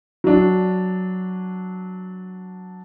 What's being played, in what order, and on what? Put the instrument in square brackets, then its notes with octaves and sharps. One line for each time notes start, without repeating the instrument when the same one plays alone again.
[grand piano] F#3 D4